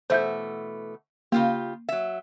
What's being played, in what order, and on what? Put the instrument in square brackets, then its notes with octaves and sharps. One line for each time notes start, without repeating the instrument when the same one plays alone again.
[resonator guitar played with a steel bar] B2 E3 A3 [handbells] C5 E5 G6
[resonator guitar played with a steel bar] C#3 F4 G4 [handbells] A#3
[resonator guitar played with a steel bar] F#3 E5